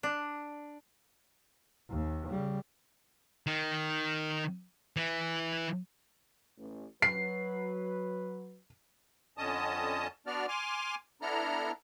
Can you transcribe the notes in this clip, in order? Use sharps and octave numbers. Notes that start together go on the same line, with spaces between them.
D4
D#2
C#3 G3
D#3
E3
A1
F#3 B4 C7
F2 D3 C#4 D#5 A5 D#6
B3 D4 F#4 D5 F6
G#5 C6 D6 F6
B3 D4 E4 A4 A#5 F6